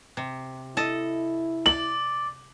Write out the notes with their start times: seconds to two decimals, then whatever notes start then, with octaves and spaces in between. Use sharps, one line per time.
0.17 C3
0.77 E4 A4 D#5
1.66 D5 F#7